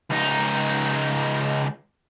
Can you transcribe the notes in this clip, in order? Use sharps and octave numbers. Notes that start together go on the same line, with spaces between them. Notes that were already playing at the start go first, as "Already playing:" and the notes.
C#2 D#4